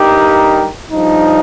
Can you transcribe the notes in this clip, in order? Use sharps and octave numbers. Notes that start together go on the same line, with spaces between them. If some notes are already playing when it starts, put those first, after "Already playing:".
Already playing: G2 G3 D#4 G4 A#4
G2 F3 D#4